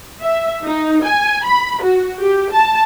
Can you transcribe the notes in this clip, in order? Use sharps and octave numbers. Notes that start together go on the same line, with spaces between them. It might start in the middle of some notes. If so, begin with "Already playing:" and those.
E5
D#4
G#5
B5
F#4
G4
A5